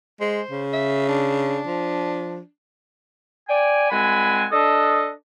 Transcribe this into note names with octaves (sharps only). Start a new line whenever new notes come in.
G#3 C5
C#3
E5
D4
F3
D5 G5 G#5
C2 G#3 C4 F#5 G#5 B5
D4 A4 D#5